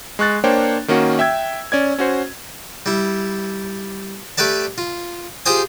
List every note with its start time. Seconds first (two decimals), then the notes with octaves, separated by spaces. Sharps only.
0.19 G#3 C#6 F#6 A6
0.44 A#3 D4 C5 C#5 G5
0.88 D#3 A#3 C#4 F#4
1.19 E5 G5 E6 G#6
1.72 C#4 D5 G#6
1.99 C#4 F#4 C5
2.86 G3 E4
4.38 A3 G4 B4 D5 A5
4.78 F4
5.46 F4 G4 G#4 C5 G#5 D#6